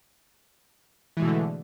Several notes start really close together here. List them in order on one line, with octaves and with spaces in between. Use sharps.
E3 G#3 B2 A3 D3